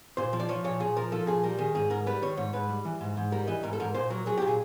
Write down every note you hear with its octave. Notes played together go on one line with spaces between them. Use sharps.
A#2 C5
F3
D5
F3 C#5
A#2 C#5
A#2 G#4
F3 A#4
F3 A4
A#2 G#4
G3 A#4
D#3 G#4
G#2 G#4
G#2 A#4
G3 B4
D#3 C#5
G#2 C#5
G#2 B4
G3
E3
G#2
G#2
G3 A#4
E3 D#5
G#2 A#4
A4
G#2 A#4
A#2 C5
F#3 A#4
F#3 G#4
A#2 G4
G#4